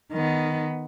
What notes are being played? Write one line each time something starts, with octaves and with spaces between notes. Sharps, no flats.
D#3 B3